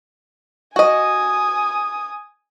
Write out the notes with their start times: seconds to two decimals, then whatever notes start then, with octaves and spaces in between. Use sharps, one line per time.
0.76 F#4 D#5 G#5 D#6